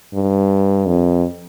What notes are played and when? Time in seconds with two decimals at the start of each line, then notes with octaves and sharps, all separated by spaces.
0.14 G2
0.86 F2